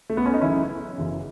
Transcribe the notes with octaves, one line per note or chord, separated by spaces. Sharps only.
A3
B3
C#4
D#4
F#1 F#2 C#3 E3 C#4 E4
F#1 F#2 C#3 E3